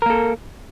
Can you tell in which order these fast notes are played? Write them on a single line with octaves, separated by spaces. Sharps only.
A#4 A#3 A4